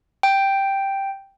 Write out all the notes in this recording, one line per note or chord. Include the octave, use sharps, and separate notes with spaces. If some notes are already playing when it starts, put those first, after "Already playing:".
G5